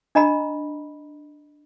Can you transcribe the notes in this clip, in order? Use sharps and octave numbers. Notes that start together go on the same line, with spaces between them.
D4 D#5 A#5 B5